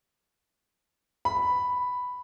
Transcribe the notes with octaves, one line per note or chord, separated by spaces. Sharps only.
B5